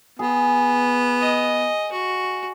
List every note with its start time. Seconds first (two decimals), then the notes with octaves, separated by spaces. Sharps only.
0.19 B3 G#4
1.21 D#5
1.92 F#4